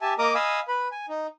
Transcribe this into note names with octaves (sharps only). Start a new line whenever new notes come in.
G4 E5 G#5 A5
A#3 A#4 D#5 A#5 D6 D#6
D#5 F5 G#5 B5 D#6 E6
B4 B5
G#5
D#4